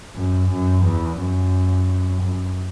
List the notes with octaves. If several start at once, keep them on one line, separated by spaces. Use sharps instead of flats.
F#2
F#2
E2
F#2
F#2